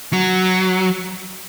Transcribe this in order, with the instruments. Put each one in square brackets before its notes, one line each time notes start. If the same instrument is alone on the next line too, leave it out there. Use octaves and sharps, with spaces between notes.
[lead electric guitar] F#3